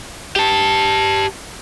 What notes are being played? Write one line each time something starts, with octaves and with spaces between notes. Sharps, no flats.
G4 A5